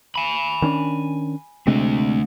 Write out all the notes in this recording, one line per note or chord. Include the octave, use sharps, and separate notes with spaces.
G#5 B5
D#3 C#4 D4
C3 G#3 A3 C4 D4